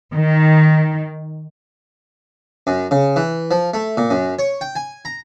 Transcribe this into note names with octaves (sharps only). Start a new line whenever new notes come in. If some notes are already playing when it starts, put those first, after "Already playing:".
D#3
F#2
C#3
E3
F3
A3
A#2
F#2
C#5
G5
G#5
A#5